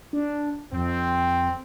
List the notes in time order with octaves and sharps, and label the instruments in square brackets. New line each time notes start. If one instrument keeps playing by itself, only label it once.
[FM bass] D4
[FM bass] F2 [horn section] C4